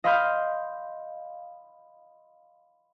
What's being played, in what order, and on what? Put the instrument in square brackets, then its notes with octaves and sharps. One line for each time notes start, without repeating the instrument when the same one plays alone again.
[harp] D#5 F5 B5 C6 F6 G6